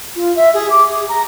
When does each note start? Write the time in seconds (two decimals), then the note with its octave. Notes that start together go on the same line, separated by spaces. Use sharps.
0.15 F4
0.35 E5
0.54 G#4
0.69 D6
0.88 G#4
1.08 A#5